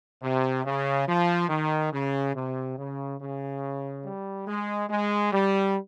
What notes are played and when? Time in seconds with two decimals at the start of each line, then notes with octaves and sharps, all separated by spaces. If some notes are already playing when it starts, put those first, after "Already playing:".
0.22 C3
0.65 C#3
1.07 F3
1.49 D#3
1.92 C#3
2.35 C3
2.77 C#3
3.20 C#3
4.04 G3
4.47 G#3
4.89 G#3
5.32 G3